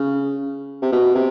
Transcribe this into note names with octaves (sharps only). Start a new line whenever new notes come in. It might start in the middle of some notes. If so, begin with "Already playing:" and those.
Already playing: C#3
C3
B2
C3